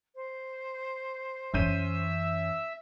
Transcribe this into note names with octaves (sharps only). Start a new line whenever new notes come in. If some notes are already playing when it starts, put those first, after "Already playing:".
C5
F#2 E3 C#4 E5 E6 G6 D#7